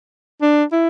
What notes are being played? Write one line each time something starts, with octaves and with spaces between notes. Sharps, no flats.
D4
E4